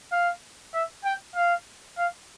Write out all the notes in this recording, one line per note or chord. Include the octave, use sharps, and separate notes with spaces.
F5
E5
G5
F5
F5